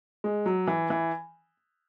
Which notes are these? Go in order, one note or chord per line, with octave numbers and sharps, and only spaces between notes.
G#3
F#3
E3
E3